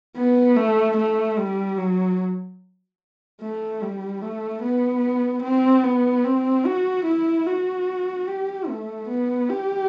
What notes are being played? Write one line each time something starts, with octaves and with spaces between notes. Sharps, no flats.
B3
A3
A3
G3
F#3
A3
G3
A3
B3
C4
B3
C4
F#4
E4
F#4
G4
A3
B3
G4